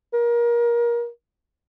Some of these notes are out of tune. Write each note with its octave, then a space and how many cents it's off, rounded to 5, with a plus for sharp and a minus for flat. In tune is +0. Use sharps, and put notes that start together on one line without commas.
A#4 +25